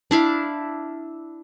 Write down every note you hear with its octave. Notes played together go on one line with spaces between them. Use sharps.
D4 E4 F5